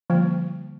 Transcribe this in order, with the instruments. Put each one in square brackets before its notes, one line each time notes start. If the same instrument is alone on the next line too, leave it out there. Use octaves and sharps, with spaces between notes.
[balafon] D3 G3 A#3 [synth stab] F3